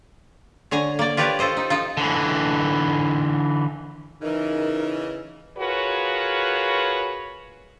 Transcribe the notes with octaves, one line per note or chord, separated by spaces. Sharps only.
D3 C#5 G#5 A#5
A#3 D5
F4 G4 A#4 B4 C#5 D5
F4 A4 C5 D#5
D#4
F3 D#4 F4
D3 E3
C#3 E3 D#4 A#4
F4 F#4 G#4 A#4 B4 C#5